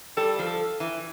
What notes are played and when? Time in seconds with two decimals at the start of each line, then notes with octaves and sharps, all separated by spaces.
0.17 G3 A4
0.39 F3
0.46 A4
0.80 E3